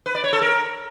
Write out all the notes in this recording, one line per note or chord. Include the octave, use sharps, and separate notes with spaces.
B4
D5
C#5
A4
A#4